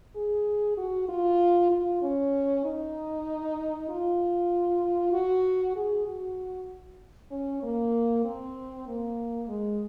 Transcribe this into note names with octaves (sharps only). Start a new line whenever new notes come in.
G#4
F#4
F4
F4
C#4
D#4
F4
F#4
G#4
F#4
C#4
A#3
C4
A#3
G#3